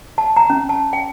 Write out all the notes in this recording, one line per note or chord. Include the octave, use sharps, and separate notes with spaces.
A5
A#5
C#4
A5
G5